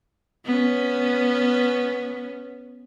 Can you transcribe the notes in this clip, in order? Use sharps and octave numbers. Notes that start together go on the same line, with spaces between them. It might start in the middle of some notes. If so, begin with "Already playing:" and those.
B3 C#4